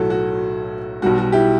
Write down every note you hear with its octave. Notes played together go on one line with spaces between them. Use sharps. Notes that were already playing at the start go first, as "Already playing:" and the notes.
Already playing: B1 A2 F#3 F#4 A4
F#4
B1 B2 G3 F#4
F#4
E4 G4